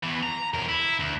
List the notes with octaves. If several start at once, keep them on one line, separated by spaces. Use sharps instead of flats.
E2 E3
A#5
E2 A#4
E4
D2